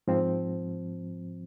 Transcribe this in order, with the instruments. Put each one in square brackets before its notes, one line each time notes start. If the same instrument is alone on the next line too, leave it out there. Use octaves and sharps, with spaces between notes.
[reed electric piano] G#2 F3 C4